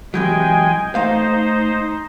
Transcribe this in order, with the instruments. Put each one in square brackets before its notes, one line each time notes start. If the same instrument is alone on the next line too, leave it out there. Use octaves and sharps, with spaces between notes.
[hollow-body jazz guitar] C3 E3 F#3 [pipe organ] G#3 G5 G#5
[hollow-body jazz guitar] A3 F5 [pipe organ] D#4 C5